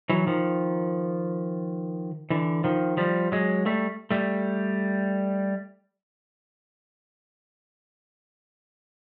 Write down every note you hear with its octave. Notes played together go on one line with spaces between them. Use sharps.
E3 F#3
D#3 F3
D3 E3
D#3 F3
F3 G3
F#3 G#3
G3 A3
G3 A3